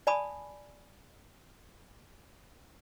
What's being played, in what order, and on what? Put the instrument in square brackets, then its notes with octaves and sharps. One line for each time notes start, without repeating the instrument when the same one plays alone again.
[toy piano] D5 G#5 A5 B5 D#6